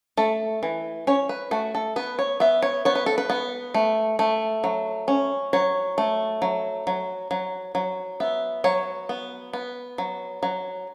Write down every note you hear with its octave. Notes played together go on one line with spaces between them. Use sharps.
A3 A4
E3
C#4 C#5
B4
A3 F#4
A4
B3 B4
C#5
B3 E5
C#5
B3 C#5
B4
A4
B4
B3
A3
A3
F#3
C#4
F#3 C#5
A3
F#3
F#3
F#3
F#3
B3 E5
F#3 C#5
B3
B3
F#3
F#3